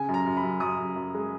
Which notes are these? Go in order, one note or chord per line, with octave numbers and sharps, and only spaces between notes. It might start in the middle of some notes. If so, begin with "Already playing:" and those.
Already playing: C#3 G#5
F#2
A#5
F#2
B5
F#2
F#2 D#6
F#2
F#2
G#3